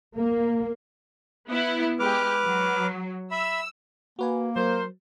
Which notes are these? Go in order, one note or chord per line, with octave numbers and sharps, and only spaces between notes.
A#3
B3 E4
G#3 G4 B4 D6 F6
F#3
E5 B5 E6
A#3 F#4 B4 G#5
F#3 A#4 C5